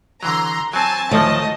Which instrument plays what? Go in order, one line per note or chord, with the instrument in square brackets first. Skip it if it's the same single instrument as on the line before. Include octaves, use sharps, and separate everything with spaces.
[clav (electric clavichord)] D3 E3 F#3 [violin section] A#5 C6
[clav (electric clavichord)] F#3 C4 [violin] G#5 [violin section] A5
[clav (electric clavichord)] D2 F3 [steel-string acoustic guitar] D#3 F#3 A3 [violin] D#5